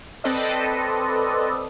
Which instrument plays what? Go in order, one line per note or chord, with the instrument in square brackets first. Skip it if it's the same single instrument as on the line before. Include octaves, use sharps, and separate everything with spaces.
[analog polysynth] C4 A4 B4 D5 D#5